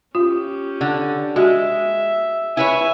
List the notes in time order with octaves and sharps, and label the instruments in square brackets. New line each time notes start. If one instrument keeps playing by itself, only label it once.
[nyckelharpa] C#4 G4 [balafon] F4
[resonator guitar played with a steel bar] D3
[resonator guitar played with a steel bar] G#3 [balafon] F#4 [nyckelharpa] E5
[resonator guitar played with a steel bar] E4 B4 C#5 [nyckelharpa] E5 G#5